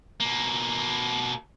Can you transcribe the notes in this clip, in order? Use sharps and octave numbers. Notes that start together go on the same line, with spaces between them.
B2 A#3